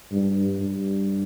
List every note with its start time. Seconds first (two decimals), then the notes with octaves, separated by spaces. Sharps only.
0.12 G2
0.60 G2